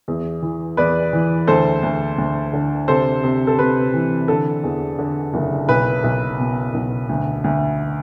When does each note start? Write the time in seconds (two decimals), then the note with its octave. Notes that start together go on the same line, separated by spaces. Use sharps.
0.08 E2
0.42 E3
0.77 E2 B4 D5
1.13 E3
1.47 D2 A4 C5
1.83 D2
2.18 D2
2.53 D3
2.88 C3 A4 C5
3.24 C3
3.47 A4
3.58 C3 B4
3.94 E3
4.28 D3 A4
4.64 E2
4.99 D3
5.34 F#1
5.69 B1 B4
6.04 B1
6.39 B2
6.74 B1
7.09 D2
7.44 D2